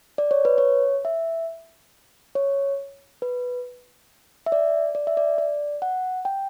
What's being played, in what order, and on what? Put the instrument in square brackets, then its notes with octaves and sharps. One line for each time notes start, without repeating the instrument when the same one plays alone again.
[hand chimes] D5
C#5
B4
C#5
E5
C#5
B4
E5
D5
D5
E5
D5
D5
F#5
G5